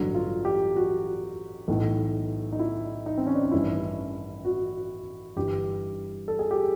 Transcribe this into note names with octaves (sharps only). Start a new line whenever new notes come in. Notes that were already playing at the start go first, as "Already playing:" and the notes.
Already playing: A1 G2 D3 F#3
F4
G4
F#4
B1 A2 E3
D#4
E4
D#4
C4
C#4
D4
D#4
A1 G2 D#3 E4
F#4
G1 G2 E3 G4
A4
G#4
G4